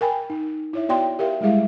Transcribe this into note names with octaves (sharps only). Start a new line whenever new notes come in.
A#4 G5 G#5 B5
D#4
E4 C#5 E5
B3 F#4 C#5 D5 G5 C6
G4 A#4 E5 F5 G5
G3 G#3 E4 G#4 E5 F5